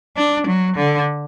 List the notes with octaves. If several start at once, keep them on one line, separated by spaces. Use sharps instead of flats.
D4
F#3
D3